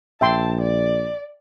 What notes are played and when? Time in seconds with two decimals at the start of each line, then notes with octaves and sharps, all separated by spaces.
0.21 A#1 E5 G5 A5 C6
0.62 D5